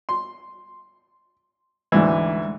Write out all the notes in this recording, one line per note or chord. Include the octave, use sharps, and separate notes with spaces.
C6
D2 G#2 E3